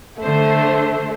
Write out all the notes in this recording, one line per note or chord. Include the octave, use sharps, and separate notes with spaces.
D3 A3 C5